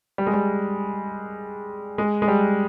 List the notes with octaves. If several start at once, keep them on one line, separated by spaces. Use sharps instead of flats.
G3
G#3
G3
G#3
G#3
G3